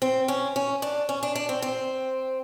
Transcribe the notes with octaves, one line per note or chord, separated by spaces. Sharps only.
C4
C#4
C#4
D4
C#4
D4
D4
C4
C4